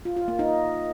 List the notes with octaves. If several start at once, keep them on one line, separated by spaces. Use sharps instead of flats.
F4
F4
A#3
D#4